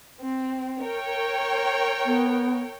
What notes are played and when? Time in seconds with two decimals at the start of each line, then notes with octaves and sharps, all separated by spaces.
0.20 C4
0.82 A#4 C#5 G5
2.05 B3